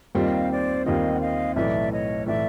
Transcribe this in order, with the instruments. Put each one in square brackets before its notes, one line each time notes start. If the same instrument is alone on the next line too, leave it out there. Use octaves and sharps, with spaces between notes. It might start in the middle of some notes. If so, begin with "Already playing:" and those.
[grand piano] D#2 D#3 G3 C4 F4 [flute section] D#5 F5
[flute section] C5 D5
[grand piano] D#2 D#3 G3 C4 F4 [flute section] D#5 F5
[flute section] F#5
D#5 F5
[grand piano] B1 A2 E3 A3 [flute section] D5 E5
[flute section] C#5 D#5
[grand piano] A2 E3 A3 [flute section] D5 E5